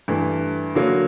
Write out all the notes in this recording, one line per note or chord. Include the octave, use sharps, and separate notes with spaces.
G2 E3 A3
D3 F#3 A#3